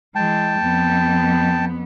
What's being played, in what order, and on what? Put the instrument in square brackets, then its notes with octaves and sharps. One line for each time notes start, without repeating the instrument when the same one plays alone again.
[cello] E3 G#3 [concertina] G5 A5
[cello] F2 B3